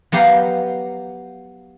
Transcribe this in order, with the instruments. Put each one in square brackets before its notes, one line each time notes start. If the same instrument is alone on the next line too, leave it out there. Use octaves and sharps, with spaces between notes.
[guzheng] F#3 B3 G4 F5 A#5